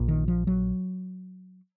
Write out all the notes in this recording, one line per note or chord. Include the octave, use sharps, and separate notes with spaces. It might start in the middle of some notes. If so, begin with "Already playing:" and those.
Already playing: A#1 A#2
D#3
F3
F#3